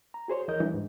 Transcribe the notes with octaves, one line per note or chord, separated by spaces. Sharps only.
A#5
F#4 G#4 C5 C#5
D#2 E3 A#4 C#5 D#5 G6
E3 F#3 G3 D4
D#2 G#2